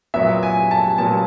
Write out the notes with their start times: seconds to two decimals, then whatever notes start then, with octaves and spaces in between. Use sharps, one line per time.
0.14 A#2 F#3 B3 E5
0.43 G#5
0.71 A5
0.98 A#2 F#3 B3 A5